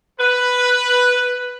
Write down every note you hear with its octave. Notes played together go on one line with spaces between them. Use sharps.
B4